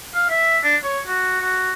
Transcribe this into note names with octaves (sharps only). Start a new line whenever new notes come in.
F5
E5
D4
C#5
F#4
F#4